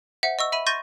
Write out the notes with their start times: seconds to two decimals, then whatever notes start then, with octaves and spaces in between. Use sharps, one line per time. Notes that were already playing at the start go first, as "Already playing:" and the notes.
0.23 C5 E5 F#5
0.39 D#5 C#6 E6
0.52 E5 B5 D#7
0.66 C6 C#6 G6 A6 A#6 D#7